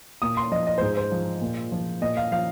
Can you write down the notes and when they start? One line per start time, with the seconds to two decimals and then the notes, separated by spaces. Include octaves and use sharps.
0.22 A#2 D#6
0.37 C6
0.51 F3 D#5
0.67 D#5
0.78 G#2 C5
0.97 C5
1.12 F3
1.41 A#2
1.72 F3
2.01 A#2 D#5
2.17 F5
2.32 F3 F5